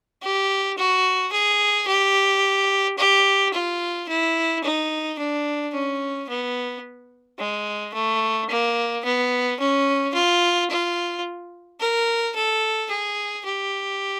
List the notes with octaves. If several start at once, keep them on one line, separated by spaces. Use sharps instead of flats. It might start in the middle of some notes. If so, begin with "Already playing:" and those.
G4
F#4
G#4
G4
G4
F4
E4
D#4
D4
C#4
B3
G#3
A3
A#3
B3
C#4
F4
F4
A#4
A4
G#4
G4